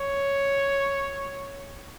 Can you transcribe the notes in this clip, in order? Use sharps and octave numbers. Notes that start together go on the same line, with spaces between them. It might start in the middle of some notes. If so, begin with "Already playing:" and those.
Already playing: C#5